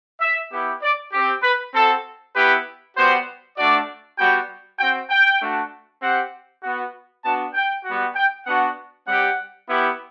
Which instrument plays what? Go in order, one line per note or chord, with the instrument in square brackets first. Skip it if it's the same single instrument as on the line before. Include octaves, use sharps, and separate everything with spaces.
[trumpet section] E5
B3 E4 G4
D5
C4 G4
B4
C4 F#4 A4
B3 E4 G4 B4
G3 B3 F#4 C5
A3 D4 F#4 D5
G3 B3 F#4 G5
C4 F#4 G5
G5
A3 D4 F#4
C4 G4 F#5
B3 F#4
B3 D4 F#4 A5
G5
G3 B3 F#4
G5
B3 D4 F#4 F#5
G3 C4 G4 F#5
B3 E4 G4